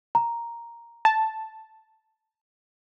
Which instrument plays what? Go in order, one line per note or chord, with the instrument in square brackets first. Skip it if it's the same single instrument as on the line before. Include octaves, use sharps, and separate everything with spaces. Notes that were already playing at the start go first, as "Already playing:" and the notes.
[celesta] A#5
[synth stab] A5